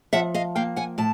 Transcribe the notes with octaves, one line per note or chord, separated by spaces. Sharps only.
F3 E5 F#5
D#5 F5
A#3 F5 G5
F#5 G#5
A2 A5